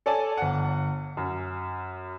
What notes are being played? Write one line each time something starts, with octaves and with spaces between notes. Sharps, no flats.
A4 C#5 D5 G#5 A5
G1 F#5
F#2